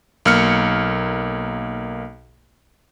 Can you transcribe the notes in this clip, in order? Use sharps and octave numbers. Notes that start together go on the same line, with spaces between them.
B1 A#3 F6 C#7